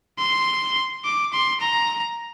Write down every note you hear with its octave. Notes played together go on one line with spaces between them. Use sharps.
C6
D6
C6
A#5